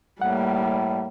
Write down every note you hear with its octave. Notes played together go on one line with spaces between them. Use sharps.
A2 G3 A#3 F#5